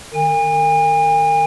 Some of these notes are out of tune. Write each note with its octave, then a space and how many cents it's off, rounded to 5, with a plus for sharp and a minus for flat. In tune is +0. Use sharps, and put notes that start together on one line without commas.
D#3 -35 G#5 -40